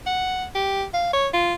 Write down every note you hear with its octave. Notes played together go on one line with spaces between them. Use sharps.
F#5
G4
F5
C#5
F4